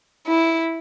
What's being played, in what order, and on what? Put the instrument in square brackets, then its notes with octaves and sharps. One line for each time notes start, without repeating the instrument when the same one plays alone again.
[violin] E4